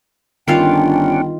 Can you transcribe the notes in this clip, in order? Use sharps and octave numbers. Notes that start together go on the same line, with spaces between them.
G1 D#3 C#4 D4 F4 F5 G5